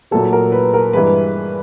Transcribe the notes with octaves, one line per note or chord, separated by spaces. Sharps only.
A#2 F#3 A3 A4
A#4
B4
A#4
G2 E3 G#3 B4